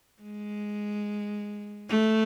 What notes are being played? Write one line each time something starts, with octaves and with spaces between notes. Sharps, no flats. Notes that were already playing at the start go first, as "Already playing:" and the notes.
G#3
A3